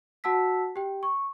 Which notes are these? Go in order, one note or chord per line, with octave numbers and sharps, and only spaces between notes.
F#4 F#5 A5 E6 B6
G4 G5
C#6